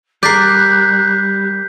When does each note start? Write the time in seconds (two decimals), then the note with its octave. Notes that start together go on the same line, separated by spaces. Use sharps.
0.23 G3 A#4 D5 F#6 G6 B6 C7